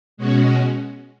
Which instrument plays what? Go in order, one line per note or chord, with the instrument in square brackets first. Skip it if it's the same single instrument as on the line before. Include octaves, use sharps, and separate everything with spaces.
[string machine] B2 G#3 C#4 F#4